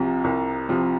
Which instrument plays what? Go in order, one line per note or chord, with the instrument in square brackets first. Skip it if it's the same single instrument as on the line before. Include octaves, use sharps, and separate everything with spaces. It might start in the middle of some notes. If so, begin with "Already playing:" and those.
Already playing: [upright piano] C2 C3 F3
C2
C3 F3